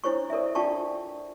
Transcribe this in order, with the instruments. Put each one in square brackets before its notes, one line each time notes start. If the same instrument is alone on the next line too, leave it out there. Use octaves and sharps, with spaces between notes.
[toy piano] D4 E4 C5 C#5 C#6
A4 A#4 D5 E5
D4 F4 D5 G5 A5 C#6